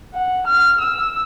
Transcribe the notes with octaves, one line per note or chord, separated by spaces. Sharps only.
F#5
F6
E6